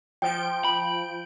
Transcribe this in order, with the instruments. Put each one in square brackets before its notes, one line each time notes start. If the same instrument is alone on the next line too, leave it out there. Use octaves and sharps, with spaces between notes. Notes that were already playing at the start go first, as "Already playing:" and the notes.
[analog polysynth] F3 G6 D7 [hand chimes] G5
[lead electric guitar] B5